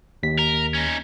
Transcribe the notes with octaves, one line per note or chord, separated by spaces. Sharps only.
D#2 B6
A#4
C#4 D#4